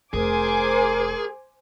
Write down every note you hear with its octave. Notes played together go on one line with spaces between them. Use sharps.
F1 G#4 A#4 C5 G#5 D6